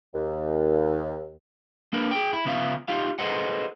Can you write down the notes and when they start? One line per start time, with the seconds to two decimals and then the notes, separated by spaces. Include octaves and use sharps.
0.14 D#2
1.93 A#3 D4 A#4 B4
2.11 G#4 G5
2.33 E4
2.45 C#2 C#3 B3 F4 E5 F5
2.88 D#4 F4 G4 F5
3.19 G#4 A4 B4 C5 D#5 F#5